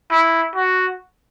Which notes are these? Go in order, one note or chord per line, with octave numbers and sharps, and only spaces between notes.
E4
F#4